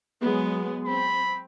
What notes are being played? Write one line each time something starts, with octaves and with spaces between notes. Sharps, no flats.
F#3 G#3 B3
C4 B5